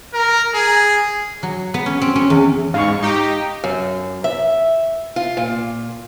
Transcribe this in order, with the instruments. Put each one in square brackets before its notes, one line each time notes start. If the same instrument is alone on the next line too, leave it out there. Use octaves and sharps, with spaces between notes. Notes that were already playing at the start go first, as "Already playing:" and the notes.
[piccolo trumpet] A#4
G#4
[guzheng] F#3
B3
C#4
C4
C#4
E2
[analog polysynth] G#2 [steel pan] F5 C#6
[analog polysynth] D#4 G4
[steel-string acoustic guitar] F#2
E5
F4
A#2